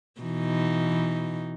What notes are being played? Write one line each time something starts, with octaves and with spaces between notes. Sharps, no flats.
B2 E3 D#4